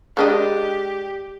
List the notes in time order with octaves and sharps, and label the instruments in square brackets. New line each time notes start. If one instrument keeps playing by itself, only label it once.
[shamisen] G#3 D4 D#5 [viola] G4